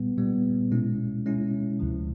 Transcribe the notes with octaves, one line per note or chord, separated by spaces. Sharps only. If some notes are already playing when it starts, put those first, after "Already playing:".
Already playing: A#2 G3 B3
A#2 G3 B3
B2 G#3 C#4 E4
B2 G#3 C#4 E4
D2 C3 F3